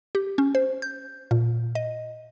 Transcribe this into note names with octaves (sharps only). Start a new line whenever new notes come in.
G4
C#4
C5
G6
A#2
D#5